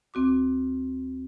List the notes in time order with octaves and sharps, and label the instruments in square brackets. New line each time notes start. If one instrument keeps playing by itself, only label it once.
[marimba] D2 C4 F#4 D6